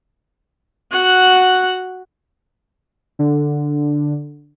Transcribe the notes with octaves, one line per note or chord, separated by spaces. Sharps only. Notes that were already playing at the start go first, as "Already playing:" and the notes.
F#4 F#5
D3